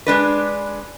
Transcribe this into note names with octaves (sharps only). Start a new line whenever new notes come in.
G#3 D4 B4